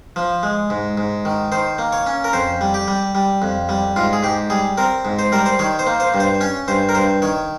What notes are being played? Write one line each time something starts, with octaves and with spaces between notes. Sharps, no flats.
F3
G#3
G#2
G#2
D#3
D#3 C5
A#3
C#5
C#4
A#4
F2 C5
G3
G4
G3
G3
F2
G3
G#2 F4
G#4
G#2 G4
G3 G#4
C4 A#4
G#2
C5
G3 A#4
C5
D#3 C#5
C5
A#3
C5
G2
C5
C#4 C#5
G2 C5
A#4
G2 C5
D#3 C#5